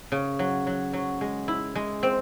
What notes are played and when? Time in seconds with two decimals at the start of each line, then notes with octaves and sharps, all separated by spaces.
0.12 C#3
0.39 F#3
0.67 F#3
0.93 F#3
1.21 G#3
1.48 E4
1.75 G#3
2.03 C4